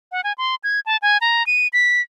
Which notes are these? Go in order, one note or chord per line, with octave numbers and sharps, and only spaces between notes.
F#5
G#5
C6
G#6
A5
G#5
A#5
D#7
B6